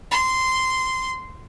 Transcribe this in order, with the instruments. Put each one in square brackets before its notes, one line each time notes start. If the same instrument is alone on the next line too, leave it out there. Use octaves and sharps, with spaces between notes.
[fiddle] C6